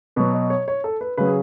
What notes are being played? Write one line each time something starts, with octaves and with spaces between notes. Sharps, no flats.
B2 F#3 B4
D#5
C#5
C#5
A4
B4
C#3 F#3 B4
G#4